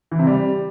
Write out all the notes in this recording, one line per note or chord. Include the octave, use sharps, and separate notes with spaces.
E3
C3
G3